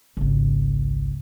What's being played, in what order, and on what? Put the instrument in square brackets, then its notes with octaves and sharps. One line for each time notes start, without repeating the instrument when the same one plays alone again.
[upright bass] G#1 C#2